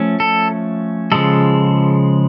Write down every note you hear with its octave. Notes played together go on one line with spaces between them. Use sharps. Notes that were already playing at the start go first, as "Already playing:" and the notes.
Already playing: F3 A3 C#4
A4
C#3 F3 G#3 A4